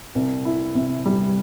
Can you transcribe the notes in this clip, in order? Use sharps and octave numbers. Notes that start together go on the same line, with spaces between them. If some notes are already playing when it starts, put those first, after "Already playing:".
C2
E4
C3
G3